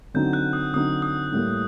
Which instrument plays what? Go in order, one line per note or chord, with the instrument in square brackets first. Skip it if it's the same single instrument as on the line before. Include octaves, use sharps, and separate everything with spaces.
[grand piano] D3 F#3 C4 D#4 [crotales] G6
[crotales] F#6
D#6
[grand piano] D3 F#3 C4 D#4 [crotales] D#6
[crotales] D#6
[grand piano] A2 G3 A#3